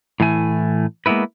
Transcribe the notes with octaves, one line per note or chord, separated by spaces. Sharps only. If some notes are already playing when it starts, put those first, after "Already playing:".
A2 E3 A3 G#5
G#3 A#3 B3 E4 B4